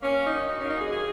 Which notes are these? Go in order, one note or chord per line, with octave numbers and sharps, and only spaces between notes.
A#3 C#4
F#2
D#4
D#3
F#2 D#4
A#3 C#4
D#4
F#2 G#4
D#3 G#4